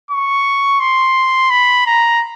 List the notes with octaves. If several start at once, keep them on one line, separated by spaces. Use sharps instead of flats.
C#6
C6
B5
A#5